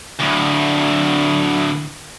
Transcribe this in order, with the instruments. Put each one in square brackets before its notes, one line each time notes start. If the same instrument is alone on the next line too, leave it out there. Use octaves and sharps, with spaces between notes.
[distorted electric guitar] D2 A2